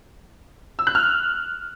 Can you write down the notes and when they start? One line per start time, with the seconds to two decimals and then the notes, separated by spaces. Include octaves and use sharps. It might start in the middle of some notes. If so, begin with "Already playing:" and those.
0.79 E6
0.87 F#6
0.95 F6